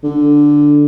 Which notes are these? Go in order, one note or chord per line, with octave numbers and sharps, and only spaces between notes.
D3